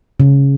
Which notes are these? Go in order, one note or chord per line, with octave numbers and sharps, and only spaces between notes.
C#3